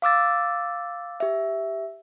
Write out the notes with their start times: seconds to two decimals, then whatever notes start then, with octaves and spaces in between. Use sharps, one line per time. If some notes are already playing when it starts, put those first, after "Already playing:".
0.02 F5 D6 E6 A6
1.20 G4 E5